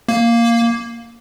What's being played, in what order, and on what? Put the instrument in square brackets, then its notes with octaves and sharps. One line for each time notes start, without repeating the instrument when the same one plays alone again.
[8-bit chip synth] A#3